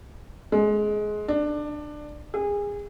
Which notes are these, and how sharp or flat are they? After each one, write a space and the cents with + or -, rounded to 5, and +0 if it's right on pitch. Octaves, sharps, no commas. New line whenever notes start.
G#3 +20
D4 +20
G#4 -25